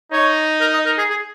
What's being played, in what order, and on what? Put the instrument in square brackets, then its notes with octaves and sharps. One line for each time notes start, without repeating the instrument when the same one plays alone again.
[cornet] D#4 [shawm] C#5
[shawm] A#4
D#5
A#4
G#4
G#4